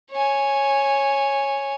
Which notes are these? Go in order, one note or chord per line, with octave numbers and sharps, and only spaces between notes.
C#5 G#5